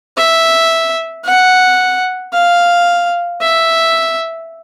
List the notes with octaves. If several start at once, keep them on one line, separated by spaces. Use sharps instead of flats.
E5
F#5
F5
E5